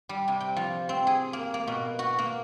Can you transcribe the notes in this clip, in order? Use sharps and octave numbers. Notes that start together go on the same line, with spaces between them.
G3
C3
G5
F3
C4
G#4
A#3
A#3
B2
F#4
A#3